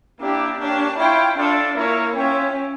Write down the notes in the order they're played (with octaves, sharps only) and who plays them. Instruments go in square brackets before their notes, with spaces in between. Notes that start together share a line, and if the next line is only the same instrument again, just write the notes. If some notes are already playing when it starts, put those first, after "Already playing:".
[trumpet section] A#3 E4 G4 D5 [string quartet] D4
[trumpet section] A#3 C#4 G4 C#5 [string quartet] D4
[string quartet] E4 [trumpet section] F4 C#5 G5
[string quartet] D4 [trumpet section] F4 A4 D5
[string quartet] A#3 [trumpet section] E4 A#4 C#5 E5
[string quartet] C#4 [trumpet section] F4 C#5 E5 G5